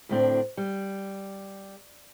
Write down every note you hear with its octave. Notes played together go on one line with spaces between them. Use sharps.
D2 A2 C4 D4
G3